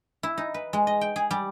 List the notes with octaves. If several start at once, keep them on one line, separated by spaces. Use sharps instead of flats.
E4
D#4
B4
G#3
D#5
G5
G#4
G3